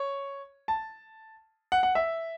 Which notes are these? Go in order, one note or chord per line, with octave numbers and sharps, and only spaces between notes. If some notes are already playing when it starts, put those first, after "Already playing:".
Already playing: C#5
A5
F#5
F#5
E5